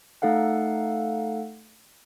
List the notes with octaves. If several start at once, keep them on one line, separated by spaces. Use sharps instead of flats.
A3 D#4 A4 F5 F#5